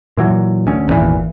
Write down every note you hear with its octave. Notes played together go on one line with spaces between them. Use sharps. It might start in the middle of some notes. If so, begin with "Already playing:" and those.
A#2 E3 F#3
D2 C#4
G#1 E2 A#2 E3